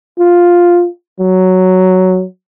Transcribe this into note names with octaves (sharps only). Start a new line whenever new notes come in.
F4
F#3